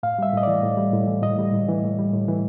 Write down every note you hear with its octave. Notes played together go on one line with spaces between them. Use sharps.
A2 F5
G3 E5
A2 D#5
E3 D5
A2
G3
A2
E3
A2 D#5
G3
A2
E3
A2
G3
A2
E3